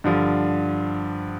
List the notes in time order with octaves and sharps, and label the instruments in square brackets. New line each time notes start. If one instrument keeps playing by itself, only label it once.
[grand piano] G2 D3 F3